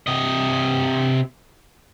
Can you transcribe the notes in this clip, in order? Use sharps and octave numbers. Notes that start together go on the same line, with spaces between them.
C3 D#5